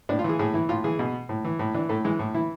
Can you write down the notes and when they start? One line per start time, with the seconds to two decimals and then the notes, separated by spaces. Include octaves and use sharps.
0.09 A2 D4
0.19 F4
0.24 E3
0.29 G#4
0.39 A2 G#4
0.54 E3 E4
0.69 A2 F4
0.84 E3 G#4
0.99 B2
1.29 A2
1.45 E3
1.59 A2
1.74 E3 D4
1.89 A2 A3
2.04 E3 G#3
2.19 A2
2.34 E3 E4